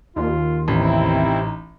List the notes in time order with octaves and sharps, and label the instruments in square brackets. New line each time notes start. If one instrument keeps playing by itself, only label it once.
[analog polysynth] D#2 [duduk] F4
[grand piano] A1 [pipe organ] C3 C4 E4 [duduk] D#4